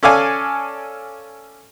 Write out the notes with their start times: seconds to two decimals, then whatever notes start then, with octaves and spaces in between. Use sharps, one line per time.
0.03 C#4 A4 D5 F5 G#5